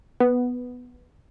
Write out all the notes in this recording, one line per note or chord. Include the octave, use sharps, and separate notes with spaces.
B3